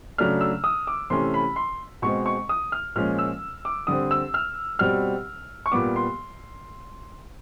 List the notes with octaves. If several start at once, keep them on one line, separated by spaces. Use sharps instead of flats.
C#3 F#3 A3 D4 F6
E6
D#6
D6
C3 E3 A3 C#4 C6
B5
C6
B2 G#3 C4 C#6
C#6
D#6
F6
A#2 F3 G#3 C#4 F6
E6
D6
D3 G3 C4 D#6
E6
F6
B2 G3 C4 F6
C#6
A#2 G3 B3 D6
C6